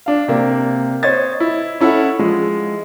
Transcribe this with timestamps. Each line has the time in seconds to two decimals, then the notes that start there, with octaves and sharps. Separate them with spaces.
0.06 D4 F5
0.28 C3 A#3
1.03 C5 C#5 D#5 G#6 A6
1.40 E4
1.80 C#4 E4 A4 F#5
2.19 F3 G#3